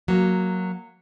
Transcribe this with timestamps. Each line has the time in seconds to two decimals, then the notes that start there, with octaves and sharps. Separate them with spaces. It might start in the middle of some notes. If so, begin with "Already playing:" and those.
0.08 F#3 A#3